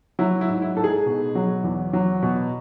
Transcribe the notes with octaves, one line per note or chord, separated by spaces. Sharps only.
F#3 E4
E4
G#2
E4
G#2 A4
G#4
B2
F#3
E2
F#3
B2